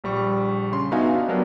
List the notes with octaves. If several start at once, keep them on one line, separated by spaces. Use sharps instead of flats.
A#1 G3 C#6
C#3 C6
B3 D#4 F#4 E5 F5 G#5
D4
F#3 G3 B3 D4 A#4